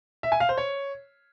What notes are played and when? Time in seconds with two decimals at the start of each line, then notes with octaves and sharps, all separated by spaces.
0.23 E5
0.32 G#5
0.40 F5
0.49 C5
0.58 C#5